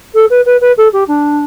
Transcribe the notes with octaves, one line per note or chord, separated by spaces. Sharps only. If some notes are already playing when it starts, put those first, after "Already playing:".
A4
B4
B4
B4
A4
G4
D4